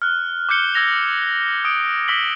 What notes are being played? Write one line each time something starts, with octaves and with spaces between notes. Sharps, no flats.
F6 F#6
D6 F6 G6 C#7 G7
E6 G#6 A#6 F7
D#6 C#7 D7
D6 E6 A#6 B6 F#7 G7